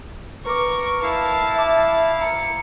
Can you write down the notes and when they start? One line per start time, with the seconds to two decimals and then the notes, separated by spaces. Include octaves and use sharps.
0.45 A#4 B4 C#6 D6
1.03 E4 F5 A5
1.55 E5 D6
2.21 A#5 C#7